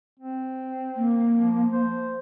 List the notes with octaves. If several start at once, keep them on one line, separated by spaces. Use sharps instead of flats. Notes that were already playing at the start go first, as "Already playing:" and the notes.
C4
A#3
F3
C5